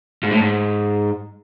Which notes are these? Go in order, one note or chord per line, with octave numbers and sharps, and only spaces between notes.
G#2
A2
G#2